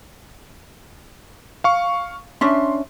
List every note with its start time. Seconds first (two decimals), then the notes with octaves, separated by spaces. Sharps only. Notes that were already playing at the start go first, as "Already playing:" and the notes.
1.64 F5 C#6
2.41 C#4 D4 E5 C6